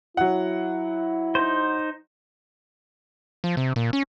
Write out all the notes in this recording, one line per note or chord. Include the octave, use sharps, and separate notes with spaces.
F#3 E4 F#5
D#4 C5
F3
C3
A#2
C#4